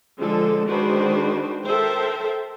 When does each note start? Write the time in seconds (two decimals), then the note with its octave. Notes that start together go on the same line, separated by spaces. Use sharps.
0.19 D3 F3 G#3 A4
0.68 D#3 G#3 D4 F#4 B4 C5
1.65 A4 A#4 C5 E5 G5